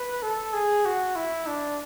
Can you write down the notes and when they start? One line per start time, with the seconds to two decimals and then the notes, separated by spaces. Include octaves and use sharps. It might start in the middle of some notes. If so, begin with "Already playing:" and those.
Already playing: B4
0.22 A4
0.53 G#4
0.85 F#4
1.16 E4
1.47 D4